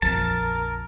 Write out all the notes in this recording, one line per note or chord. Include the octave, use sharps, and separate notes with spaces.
A#1 F2 F3 A#4 A5